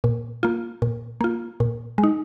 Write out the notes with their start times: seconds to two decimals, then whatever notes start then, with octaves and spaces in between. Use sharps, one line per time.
0.04 A#2
0.43 A#3 F4
0.82 A#2
1.21 A#3 F4
1.60 A#2
1.98 G#3
2.03 D#4